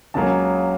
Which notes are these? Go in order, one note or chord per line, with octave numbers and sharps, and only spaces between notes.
C#2 C#3 F#3 A#3 C#4 A5